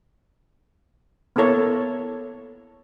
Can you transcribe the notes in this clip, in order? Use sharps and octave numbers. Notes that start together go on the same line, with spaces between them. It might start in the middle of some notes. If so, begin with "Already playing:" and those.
A#3 B3 E4 A4 C#5